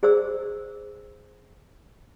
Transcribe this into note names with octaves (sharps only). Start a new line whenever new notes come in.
G#4 C5 D5 E6